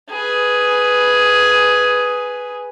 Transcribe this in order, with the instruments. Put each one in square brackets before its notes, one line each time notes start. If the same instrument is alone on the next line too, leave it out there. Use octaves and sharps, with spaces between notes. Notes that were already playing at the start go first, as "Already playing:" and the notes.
[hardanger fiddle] G#4 B4